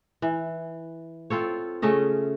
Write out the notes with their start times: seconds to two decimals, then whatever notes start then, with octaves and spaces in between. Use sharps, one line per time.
0.22 E3
1.30 C4 F4 A4 C#5
1.82 C#3 A3 C#4 D#5